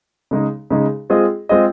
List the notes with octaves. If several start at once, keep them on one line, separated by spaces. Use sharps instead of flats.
C#3 G#3 D#4
C#3 G#3 D#4
G#3 C4 F4 G#4 D#5
G#3 C4 F4 G#4 D#5